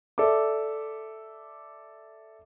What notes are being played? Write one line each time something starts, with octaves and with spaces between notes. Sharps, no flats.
A4 D5 E5 D6